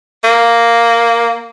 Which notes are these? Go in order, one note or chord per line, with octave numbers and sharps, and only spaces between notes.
A#3